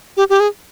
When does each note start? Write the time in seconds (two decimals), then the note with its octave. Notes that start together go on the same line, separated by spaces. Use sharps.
0.17 G4
0.30 G4
0.40 G#4